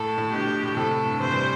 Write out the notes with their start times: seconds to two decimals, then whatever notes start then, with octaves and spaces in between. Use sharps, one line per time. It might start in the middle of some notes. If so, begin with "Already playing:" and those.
Already playing: A2 A4
0.18 A2
0.32 B2 D3 G4
0.47 A2
0.62 A2
0.76 A2 C3 A4
0.91 A2
1.05 G2
1.20 C3 E3 C5
1.31 E3 G3